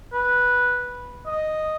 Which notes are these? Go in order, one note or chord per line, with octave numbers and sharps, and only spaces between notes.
B4
D#5